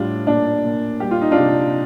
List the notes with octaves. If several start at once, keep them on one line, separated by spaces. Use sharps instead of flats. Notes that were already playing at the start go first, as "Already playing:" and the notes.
Already playing: A2 G3 D4 F4
A#2 D4
A#2
G3 G4
F4
D#4
D4 F4
C3